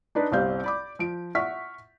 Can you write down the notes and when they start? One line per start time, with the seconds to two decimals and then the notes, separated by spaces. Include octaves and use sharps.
0.15 D4 D#4 B4 D5
0.31 G1 C2 G3 C4 F5 G6
0.64 D5 B5 D6
0.99 F3 D7
1.35 E5 F#5 C#6 F6 B6